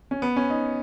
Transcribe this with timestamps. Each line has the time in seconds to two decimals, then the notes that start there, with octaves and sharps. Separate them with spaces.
0.11 C#4
0.22 B3
0.36 C#4
0.50 D#4